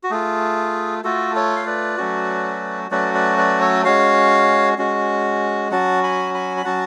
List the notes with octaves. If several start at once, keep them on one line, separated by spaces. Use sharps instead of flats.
F#4
A3 F4 G#4
A3 F4 F#4 A4
A4 C#5
F5
B4 D5
F#3 A3 C#4 F#4
F#3 A3 C#4 F#4 B4 D5
B4 D5
B4 D5
A4 C#5
G#3 C#4 F#4 C#5 F5
G#3 C#4 F#4
F#3 C#4 F#4 F#5 A5
G#5 B5
G#5 B5
B5
F#3 C#4 F#4 F#5 A5